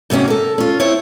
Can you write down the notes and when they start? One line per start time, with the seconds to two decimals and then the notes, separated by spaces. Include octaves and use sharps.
0.10 G#2 C3 A#3 C#4 F#4
0.28 A4 A#4
0.58 C#4 F4
0.80 C4 E4 C#5